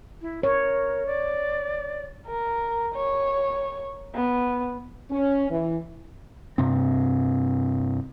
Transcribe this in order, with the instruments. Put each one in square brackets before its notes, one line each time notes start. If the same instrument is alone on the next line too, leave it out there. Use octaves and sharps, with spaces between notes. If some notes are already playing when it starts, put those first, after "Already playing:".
[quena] E4
[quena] A#4 [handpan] C#5
[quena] D5
[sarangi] A#4
C#5
B3
[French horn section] C#4
E3
[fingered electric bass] G2 C3 C4